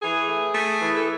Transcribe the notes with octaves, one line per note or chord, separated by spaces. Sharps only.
E3 G#4
A3
A3
E3
A4